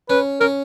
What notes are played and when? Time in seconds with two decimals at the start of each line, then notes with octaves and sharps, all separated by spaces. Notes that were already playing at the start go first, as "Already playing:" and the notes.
0.10 C#4 B4
0.41 C#4 A#4